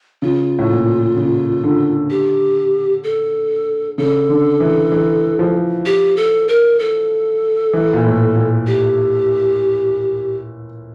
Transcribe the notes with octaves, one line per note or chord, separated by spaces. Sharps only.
C#3 F4
A2
A#2
C#3
D3
G4
A4
C#3 A4
D3
E3
E3
F3
G4
A4
A#4
A4
E3
A#2
A2
A#2
G4